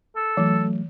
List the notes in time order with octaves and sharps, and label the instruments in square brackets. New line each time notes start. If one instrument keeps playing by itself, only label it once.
[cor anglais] A4
[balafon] E3 [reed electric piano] F#3 A3